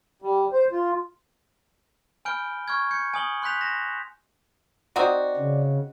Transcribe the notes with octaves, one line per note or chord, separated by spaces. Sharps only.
G3
C5
F4
G#5 B5 F6 G6 D7 G7
C#6 F6 G#6
G6 G#6 C#7
G#5 D#6 F#7 G7
C6 F#6 G6 B6 F7
A#6 E7
C4 D#4 F#4 D5
C#3